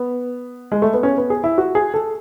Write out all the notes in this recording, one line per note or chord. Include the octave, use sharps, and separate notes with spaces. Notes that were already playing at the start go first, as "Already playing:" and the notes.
Already playing: B3
G#3
A3
B3
C#4
B3
G#4
E4
F#4
G#4
A4